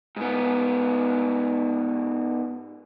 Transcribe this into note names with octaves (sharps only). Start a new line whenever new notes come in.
G#2 B3